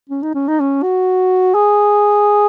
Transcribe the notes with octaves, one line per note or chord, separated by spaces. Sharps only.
C#4
D#4
C#4
D#4
C#4
F#4
G#4